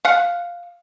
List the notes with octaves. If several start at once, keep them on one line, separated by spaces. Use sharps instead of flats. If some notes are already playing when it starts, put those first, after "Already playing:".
F5 F#5